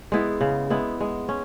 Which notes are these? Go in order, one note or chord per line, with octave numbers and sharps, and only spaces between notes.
G#3 B3 E4
C#3
G#3 B3 E4
G#3
C#4